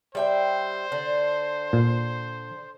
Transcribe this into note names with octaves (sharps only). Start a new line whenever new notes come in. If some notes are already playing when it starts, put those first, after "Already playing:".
G3 C5 E5 G5
D3
A#2